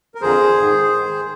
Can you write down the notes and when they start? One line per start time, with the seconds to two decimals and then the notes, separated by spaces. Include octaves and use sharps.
0.15 A#4
0.22 F2 D3 F3 G#4 C5
0.57 G#2 D#3
0.93 G#2 D#3